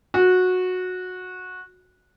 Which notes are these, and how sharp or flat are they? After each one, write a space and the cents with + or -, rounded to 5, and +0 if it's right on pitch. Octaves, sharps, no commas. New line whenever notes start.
F#4 -15